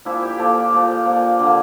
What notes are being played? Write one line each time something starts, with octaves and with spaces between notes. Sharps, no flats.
A#2 F3 A#3 E4 E5
G4 G5
A#2 F3 A#3 A4 A5
A#2 F3 A#3
A#2 F3 A#3
D3 G3 A#3